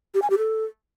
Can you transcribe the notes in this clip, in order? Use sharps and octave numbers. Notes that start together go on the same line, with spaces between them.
G4
G#5
G4
A4